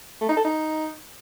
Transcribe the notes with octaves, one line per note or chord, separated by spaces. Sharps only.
A3
D#4
A4
D#4